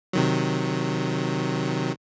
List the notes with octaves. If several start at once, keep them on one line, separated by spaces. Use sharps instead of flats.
C3 D#3 F#3